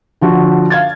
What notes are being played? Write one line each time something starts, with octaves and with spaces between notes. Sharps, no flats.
D3 F3 F#4
F5 G#6 A6